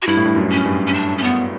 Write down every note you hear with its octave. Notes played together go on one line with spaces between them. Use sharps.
F#4
G2 E4
A2
G2
F#2
C#4
G2
C#4
D4
C#4
B3